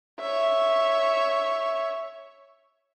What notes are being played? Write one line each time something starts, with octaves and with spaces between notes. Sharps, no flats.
C#5 E5